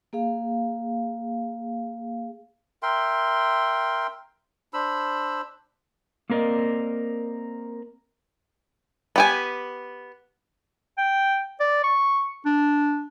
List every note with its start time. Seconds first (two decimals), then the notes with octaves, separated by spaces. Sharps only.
0.13 A#3 G#4 F5
2.83 A#4 E5 G5 C6
4.73 D4 C5 B5 E6
6.30 A#3 C4 A#4 D5 D#5
9.16 B3 G4 G#5
10.98 G5
11.60 D5
11.84 C#6
12.46 D4